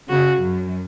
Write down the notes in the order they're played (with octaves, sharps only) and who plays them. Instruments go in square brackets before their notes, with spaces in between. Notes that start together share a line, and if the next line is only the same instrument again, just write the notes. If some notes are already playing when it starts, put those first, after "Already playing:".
[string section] C#3 [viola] F#4
[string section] F#2